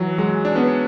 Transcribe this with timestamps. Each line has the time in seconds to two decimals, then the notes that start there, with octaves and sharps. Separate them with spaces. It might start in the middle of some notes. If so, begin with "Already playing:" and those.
Already playing: E3 F#3
0.18 F#3 G#3
0.45 D4
0.55 B3 C#4